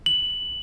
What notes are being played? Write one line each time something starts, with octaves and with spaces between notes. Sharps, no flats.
F#7